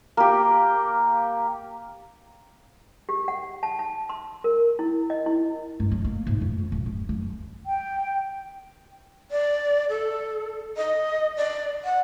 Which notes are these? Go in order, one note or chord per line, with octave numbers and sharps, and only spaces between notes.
A#3 G4
G4
F#5
A5
A5
C6
A#4
E4
D#5
E4
G2
F#3
A#3
G#2
F2
C#2
D1
F#2
F#2
G5
D5
A4
D#5
D5
F#5